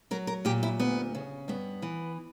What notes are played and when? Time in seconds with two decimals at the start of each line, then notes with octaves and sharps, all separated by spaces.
0.11 F#3 A#4
0.27 A#4
0.45 A#2 G4
0.63 E4
0.80 D2 B3
1.15 C#3
1.48 G2 B3
1.82 E3